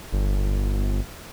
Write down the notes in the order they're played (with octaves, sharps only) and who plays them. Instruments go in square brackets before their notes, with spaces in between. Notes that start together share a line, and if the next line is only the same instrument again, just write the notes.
[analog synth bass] G1